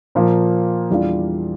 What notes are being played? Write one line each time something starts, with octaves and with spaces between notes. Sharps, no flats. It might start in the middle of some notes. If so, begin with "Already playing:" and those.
A#2 F3 A#3 F4
E2 E3 G3 D4 F4